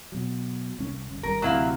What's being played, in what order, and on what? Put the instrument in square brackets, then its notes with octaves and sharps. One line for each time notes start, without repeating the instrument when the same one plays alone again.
[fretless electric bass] B2 F#3
C2 C#4
G1
[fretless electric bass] G#1 G2 [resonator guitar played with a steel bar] A#4
[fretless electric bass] D2 C3 [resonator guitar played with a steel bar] F#3 E4 F5